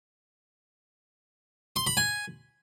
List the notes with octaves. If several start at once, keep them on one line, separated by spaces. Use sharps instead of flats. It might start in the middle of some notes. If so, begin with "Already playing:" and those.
C6
B5
G#5